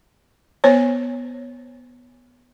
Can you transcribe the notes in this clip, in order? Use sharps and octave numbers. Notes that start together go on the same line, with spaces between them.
B3 C5 C#5